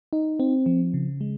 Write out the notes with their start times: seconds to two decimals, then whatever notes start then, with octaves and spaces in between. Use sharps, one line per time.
0.13 D#4
0.40 C4
0.66 F3
0.94 C#3
1.21 G#3